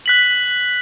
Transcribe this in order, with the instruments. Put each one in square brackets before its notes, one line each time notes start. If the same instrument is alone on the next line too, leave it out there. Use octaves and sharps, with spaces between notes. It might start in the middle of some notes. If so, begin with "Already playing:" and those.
[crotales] F#6 B6 F#7